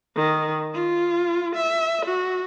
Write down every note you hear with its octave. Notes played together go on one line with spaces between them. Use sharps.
D#3
F4
E5
F#4